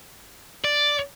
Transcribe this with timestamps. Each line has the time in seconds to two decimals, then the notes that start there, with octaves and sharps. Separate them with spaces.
0.64 D5